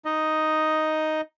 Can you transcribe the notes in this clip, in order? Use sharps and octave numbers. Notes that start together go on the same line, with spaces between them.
D#4 D#5